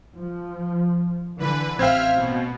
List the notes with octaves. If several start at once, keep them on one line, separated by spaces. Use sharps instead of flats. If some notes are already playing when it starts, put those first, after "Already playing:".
F3
D3 E3 B4
A1 C4 C5 E5 F5 G5 F6 G#6
B2